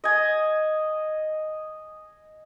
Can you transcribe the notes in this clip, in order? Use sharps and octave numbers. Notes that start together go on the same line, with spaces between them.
D#5 G#5